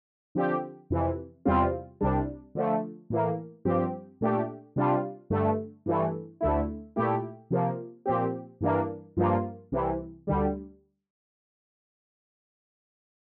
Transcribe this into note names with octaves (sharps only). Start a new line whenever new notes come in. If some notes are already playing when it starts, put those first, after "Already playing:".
D3 F3 C4 G4
F2 C3 E3
E2 C3 G3 C4 F4
C2 C3 G3 D4
D3 F3 A3
A2 E3 A#3
G2 F3 C4 G4
A#2 A3 D4 G4
C3 G3 D4 F4
G2 D3 A3
G2 E3 A3
D2 D3 A3 E4
A#2 A3 E4 G4
C3 F3 A#3
A#2 F3 C4 G4
G2 E3 A#3 D4
G2 F3 A#3 F4
C2 C3 E3
D2 D3 G3